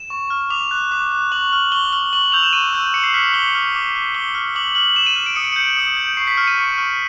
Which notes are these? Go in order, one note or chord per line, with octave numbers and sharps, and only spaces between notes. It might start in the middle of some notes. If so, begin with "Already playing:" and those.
Already playing: E7
C#6
F6
D6 F7
F#6
D6
F#6
C#6 F#7
F6
C#6 G7
F6 F#7
C#6 F#7
E6 G6 F7
E7
C#6 D#7
E6 G6
D6 C#7
C7
F6 B6
C#7
D6 G7
F6
D6
F6
D6 G7
F6
D6 F#7
F6 F#7
D6 E7
D#7
F6 E7
D7
D#6 C#7
D7
G6 C#7
D#6
G6
C#6 C7
B6
F6 C#7
D#7
C#6
F6